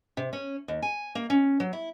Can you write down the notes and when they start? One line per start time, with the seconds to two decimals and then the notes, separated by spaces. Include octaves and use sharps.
0.17 C3
0.33 C#4
0.68 D#2
0.82 G#5
1.15 A#3
1.30 C#4
1.60 F#3
1.73 E4